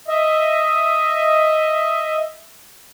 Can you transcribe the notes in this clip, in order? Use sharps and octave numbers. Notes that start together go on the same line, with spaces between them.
D#5 E5